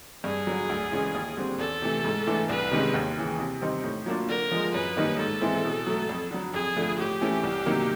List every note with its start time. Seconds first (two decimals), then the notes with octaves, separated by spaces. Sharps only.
0.24 G2 G#4
0.47 D3 F#3
0.69 D2
0.92 C#3 E3 G#3 C#4
1.14 D#2
1.37 D3 G3 C4
1.59 E2 A4
1.82 C3 E3 A3
2.05 G#2
2.27 E3 A3 D4
2.49 C2 B4
2.71 C3 D#3 G#3 C#4
2.94 D#2
3.17 C#3 E3
3.39 C3
3.61 D#3 G3 C4 D#4
3.84 A2
4.06 F#3 A#3 D4 F4
4.29 D3 A#4
4.52 F3 G#3
4.74 F#2 B4
4.96 D#3 G3 A#3 D#4
5.19 G#2 A4
5.41 E3 G#3 C4 E4
5.64 B2
5.87 F#3 A3
6.09 F2
6.31 D3 F#3
6.54 F2 G#4
6.76 D3 F3 A3
6.99 A2 G4
7.21 E3 A3 C#4 E4
7.43 C2
7.66 C3 D#3 F#3 A#3